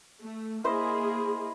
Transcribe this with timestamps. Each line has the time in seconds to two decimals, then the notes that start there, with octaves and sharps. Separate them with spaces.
0.21 A3
0.64 A#3 E4 G#4 C5 D#5